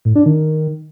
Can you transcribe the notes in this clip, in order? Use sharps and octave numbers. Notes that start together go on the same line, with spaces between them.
A2
D4
D#3